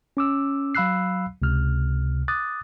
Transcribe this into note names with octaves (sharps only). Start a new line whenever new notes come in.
C#4 D6 E6
F#3 F5 B5 E6 F#6 C7
C#2 C3 F6
D6 D#6 F#6 A6